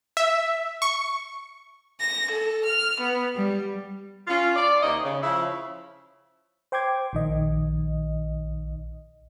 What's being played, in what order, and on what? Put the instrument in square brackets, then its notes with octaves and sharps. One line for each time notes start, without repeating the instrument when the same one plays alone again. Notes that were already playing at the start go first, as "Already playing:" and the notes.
[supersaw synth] E5
C#6
[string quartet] A#6
A4
F6
B3
G3
[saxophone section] C#4 F4
D5
D#2 C3 A#3 D#4 C#5 D#5
C#3
C#3 F3 E4
[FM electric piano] C5 G5 C6 D6 G#6
A#1 D#3 D#5